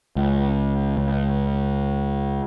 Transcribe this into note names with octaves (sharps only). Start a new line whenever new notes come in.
C#2
C#2